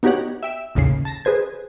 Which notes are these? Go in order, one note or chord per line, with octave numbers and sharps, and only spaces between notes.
B3 D#4 F#4 G4 C#5 F#5
E5 G5 E7
A1 D#2 A2 C#3 C7
A5 A6 A#6
G#4 B4 C5 G#6